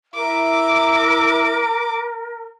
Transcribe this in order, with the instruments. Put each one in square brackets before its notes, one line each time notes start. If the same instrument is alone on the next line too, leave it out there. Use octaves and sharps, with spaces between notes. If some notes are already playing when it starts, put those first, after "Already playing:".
[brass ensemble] E4 E5 [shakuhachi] A#4 [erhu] D6